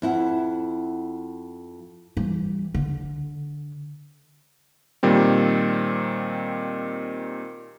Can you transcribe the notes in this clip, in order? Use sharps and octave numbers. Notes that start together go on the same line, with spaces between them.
F2 E4 F#5
E3 G3
D3
A#2 D#3 G3 C4